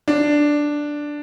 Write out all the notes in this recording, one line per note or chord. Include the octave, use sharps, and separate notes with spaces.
D4